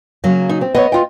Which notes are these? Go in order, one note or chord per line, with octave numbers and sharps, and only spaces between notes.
C#3 F#3 A#3
D#4
C4
B3 B4 C#5 D#5
F4 G5